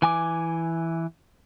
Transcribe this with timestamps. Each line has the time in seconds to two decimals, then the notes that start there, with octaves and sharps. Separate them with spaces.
0.02 E3 G#5 D6